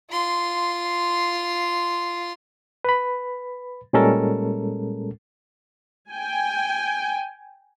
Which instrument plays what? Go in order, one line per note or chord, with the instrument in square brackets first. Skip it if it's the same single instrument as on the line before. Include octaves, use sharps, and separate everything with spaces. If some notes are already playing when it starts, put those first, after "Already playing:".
[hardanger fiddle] F4 C6
[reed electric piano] B4 B5
A#2 G3 G#3 C#4 A4 A#4
[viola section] G5 G#5